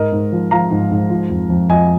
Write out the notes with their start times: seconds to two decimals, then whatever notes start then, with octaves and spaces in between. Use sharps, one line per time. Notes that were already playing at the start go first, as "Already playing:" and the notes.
Already playing: G#2 A#4 D#5
0.12 G#2
0.32 F3
0.51 F3 F5 A#5
0.71 G#2
0.92 G#2
1.10 F3
1.30 F2
1.50 F2
1.69 F2 D#5 G#5